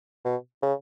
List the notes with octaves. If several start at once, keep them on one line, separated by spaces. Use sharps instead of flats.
B2
C#3